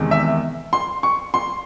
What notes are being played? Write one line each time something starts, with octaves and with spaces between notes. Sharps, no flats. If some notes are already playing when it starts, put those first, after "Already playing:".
Already playing: E2 C3 D#3 G#3
E5
C6
C#6
C6